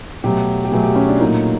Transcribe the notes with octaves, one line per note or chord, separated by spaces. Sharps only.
B2 F#3 A3 G4
G4
B2 F#3 A3 G#4
G4
C#4
D4
A#2 F#3 A3 D#4